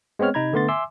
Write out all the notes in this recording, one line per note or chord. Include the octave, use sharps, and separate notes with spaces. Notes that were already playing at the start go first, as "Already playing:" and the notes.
G#3 B3 C4 C#5 F6
C3 D#4 A#5 B5 G#6
D3 A3 B3 C6 A6
E5 G#5 C6 D6 E6